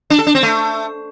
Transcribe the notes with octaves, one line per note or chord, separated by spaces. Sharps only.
D4
A4
D4
C4
A3